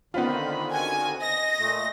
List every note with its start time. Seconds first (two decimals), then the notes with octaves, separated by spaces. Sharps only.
0.14 D3 D#3 B3 C4 D#4 F4 C5 B5
0.74 C#3 F#4 G#5
1.20 D#5 A#6
1.59 A#2 A3